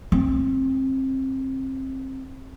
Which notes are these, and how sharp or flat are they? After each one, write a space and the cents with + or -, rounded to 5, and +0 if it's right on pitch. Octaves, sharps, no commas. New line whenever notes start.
C4 +25